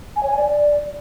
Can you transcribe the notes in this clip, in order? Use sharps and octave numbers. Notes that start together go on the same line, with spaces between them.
G#5
C#5
G#5
D5